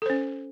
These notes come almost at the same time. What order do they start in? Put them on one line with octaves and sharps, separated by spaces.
A4 C5 C#4